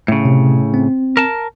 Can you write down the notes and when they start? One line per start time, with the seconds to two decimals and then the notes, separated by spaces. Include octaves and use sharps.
0.08 A2 C#3
0.25 C3
0.74 C4
1.17 A#4 A5